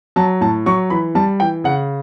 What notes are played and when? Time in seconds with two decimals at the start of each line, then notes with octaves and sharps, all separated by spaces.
0.16 F#3 A5
0.41 A2 A5
0.66 F#3 C#6
0.90 E3 B5
1.15 G3 A5
1.40 E3 G5
1.64 C#3 F#5